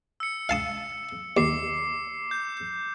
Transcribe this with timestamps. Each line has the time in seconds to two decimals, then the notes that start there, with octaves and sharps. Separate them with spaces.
0.20 E6 C#7
0.49 F5 A5 D#6
1.37 D#2 D6 C7
2.31 G6